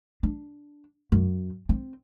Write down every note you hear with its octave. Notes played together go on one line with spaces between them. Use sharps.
D4
F#2
C4